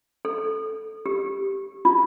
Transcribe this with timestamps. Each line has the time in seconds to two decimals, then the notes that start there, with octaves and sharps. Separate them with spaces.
0.25 A4
1.06 G4
1.85 F4